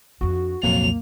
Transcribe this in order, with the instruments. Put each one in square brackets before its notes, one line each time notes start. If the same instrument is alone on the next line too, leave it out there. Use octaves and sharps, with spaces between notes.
[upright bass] F2 D4 [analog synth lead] F#4
[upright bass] C2 [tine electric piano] F2 A#2 F#3 [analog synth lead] A#3 [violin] F7